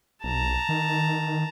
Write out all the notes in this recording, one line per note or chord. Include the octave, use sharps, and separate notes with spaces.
B1 A5 A#5
D#3